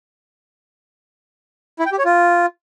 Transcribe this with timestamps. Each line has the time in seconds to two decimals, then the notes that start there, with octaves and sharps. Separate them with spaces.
1.79 E4
1.86 G5
1.92 G4
1.99 C#5
2.05 F4